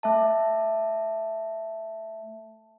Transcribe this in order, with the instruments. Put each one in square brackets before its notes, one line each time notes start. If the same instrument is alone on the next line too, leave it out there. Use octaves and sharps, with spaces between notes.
[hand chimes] A3 E5 A5